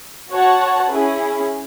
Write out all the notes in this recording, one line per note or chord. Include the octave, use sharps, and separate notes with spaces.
F#4 C#5 F#5 A5
C#4 E4 G#4